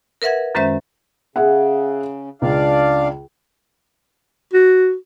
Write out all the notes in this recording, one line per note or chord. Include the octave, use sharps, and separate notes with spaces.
A#4 B4 E5 F#5 G#6
F#2 D#3 G#3 C#4 C5 E5
C#3 G#4 E5 F#5
C#2 D4 D5 F5
F#4